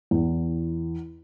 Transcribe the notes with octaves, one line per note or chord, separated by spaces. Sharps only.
E2